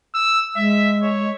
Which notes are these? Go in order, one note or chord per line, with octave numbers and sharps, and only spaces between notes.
E6
G#3 E5
C#5